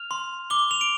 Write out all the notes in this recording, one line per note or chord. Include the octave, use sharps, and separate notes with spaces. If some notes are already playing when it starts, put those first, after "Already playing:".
Already playing: F6 F7
C6
D6 G7
F7
D7